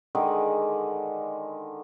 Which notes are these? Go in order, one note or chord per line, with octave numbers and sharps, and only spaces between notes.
D3 D#3 G#3